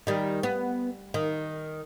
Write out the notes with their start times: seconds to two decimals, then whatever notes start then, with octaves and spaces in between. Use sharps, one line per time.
0.07 D#3 G3
0.43 B3
1.14 D#3